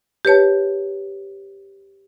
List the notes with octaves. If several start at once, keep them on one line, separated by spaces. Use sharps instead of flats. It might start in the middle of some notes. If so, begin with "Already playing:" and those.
G4 B4 C#5 A5